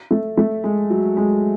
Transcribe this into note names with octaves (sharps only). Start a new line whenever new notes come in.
A3
A3
G#3
F#3
G#3